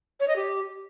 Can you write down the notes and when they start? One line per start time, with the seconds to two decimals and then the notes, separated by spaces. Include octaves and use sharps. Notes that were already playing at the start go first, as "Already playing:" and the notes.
0.20 C#5
0.28 D#5
0.36 G4